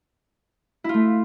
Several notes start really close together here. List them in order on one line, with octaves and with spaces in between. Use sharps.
E4 F4 A3